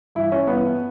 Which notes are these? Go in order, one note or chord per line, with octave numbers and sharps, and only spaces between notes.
G2 E3 E4
C#4
G2 E3 B3